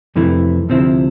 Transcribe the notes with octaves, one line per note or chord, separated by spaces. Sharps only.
F2 C3 E3 A3 E4
D2 C3 F3 C4 E4